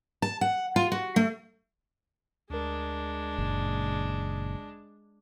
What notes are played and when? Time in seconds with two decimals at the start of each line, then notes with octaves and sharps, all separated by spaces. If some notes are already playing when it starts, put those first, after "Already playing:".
0.22 A5
0.41 F#5
0.76 F4
0.92 F#4
1.16 A3
2.50 D2 G#3 D4 A#4
3.38 F#1 A#2